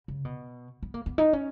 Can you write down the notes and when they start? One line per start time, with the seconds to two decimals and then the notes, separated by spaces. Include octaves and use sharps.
0.08 C#3
0.25 B2
0.83 B3
0.94 A#3
1.06 B3
1.18 D#4
1.33 C#4